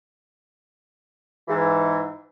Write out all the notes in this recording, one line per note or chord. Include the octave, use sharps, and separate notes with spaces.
G#2 E3